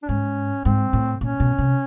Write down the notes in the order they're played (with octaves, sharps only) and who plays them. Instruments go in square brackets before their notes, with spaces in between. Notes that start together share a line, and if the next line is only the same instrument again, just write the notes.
[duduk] D4
[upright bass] G#2 [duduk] C#4
[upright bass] G#2 [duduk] C4
[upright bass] A2
[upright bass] A#2 [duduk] C#4
[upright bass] B2
C3